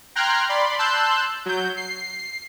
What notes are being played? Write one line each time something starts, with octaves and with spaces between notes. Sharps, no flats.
G5 A#5 C6 F6 F#6 G#6
D5 B5 C6
A5 C6 E6 F#6 G6
F#3 G6
C7